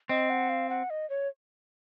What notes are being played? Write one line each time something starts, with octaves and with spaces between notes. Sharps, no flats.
C4 D#5
F#5
F5
F#5
D#5
C#5